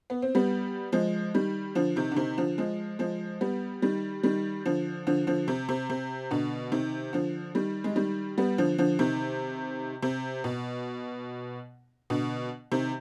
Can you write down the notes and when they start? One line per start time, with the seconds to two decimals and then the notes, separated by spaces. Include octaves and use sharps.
0.10 B3
0.22 C4
0.35 G3 B3
0.92 F3 G#3
1.34 D#3 G3
1.75 D3 F3
1.96 C3 D#3
2.12 D3
2.17 C3 D#3
2.38 D3 F3
2.58 F3 G#3
2.99 F3 G#3
3.41 G3 B3
3.82 D#3 G3
4.23 D#3 G3
4.65 D3 F3
5.07 D3 F3
5.27 D3 F3
5.48 C3
5.69 C3
5.90 C3
6.31 B2 D3
6.72 C3 D#3
7.13 D3 F3
7.55 D#3 G3
7.84 G#3
7.96 D#3 G3
8.38 G3 B3
8.58 D3 F3
8.78 D3 F3
8.99 C3 D#3
10.03 C3
10.44 B2
12.10 B2 D3
12.72 C3 D#3